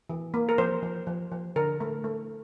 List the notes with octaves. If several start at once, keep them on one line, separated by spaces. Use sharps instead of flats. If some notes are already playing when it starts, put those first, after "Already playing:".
E3
A#3
A#4
F3 C5
F3
F3
F3
D3 A#4
A3
A3